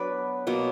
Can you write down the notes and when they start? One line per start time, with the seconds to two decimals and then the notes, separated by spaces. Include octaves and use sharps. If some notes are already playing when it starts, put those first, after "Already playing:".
Already playing: F#3 B3 D4 B4 D5
0.47 B2 F#3 A#3